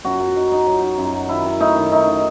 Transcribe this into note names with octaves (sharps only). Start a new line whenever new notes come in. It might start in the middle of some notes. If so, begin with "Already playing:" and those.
F#2 F#4
F#2
D#4
D#4
F#3
D#4
F#2
F#2
D#3 E4
D#3
A3 D#4
D#3
A3 D#4
D#3